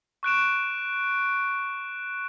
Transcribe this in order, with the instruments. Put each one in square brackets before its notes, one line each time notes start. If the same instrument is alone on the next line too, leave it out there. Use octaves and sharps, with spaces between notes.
[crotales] C#6 F#6 D7 E7